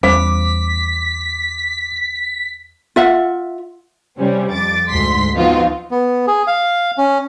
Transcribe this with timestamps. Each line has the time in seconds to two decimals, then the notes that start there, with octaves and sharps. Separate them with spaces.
0.03 E2 G3 C#4 C5 F5 B5 D6 B6
2.96 F4 E5 F#5
4.18 C3 G3 C4 C#4
4.51 F2 D6 A6
4.90 D2 G#2 C6 B6
5.34 F3 B3 C4 D#4 F4 F#4
5.91 B3
6.27 G#4
6.47 F5
6.98 C#4